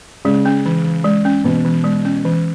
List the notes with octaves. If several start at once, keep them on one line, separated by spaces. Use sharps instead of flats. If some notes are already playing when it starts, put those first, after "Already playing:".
C#3 G#3
C#4
E3
E3
G#3
C#4
B2 E3
E3
G#3
C#4
E3